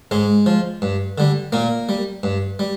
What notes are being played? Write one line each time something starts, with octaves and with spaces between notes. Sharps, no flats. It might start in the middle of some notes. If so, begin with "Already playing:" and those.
G#2 G#3
F3
G2
D3 G3
A#2 A#3
G3
G2
G3